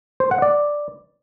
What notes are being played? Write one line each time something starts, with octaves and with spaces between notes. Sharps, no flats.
C5
F#5
D5